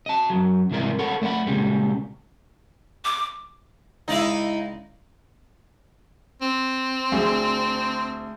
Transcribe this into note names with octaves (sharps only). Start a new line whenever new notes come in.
D#5 A5
F#2 F#3
C2 G#2 E3 E4 A#4 D5
A4 A#4 C#5 F#5 B5
A3 D5 E5 F#5 B5
A#2 C#3 G3 G#3
D6
C#2 D#4 E4 D5 F5
C4
D2 G#4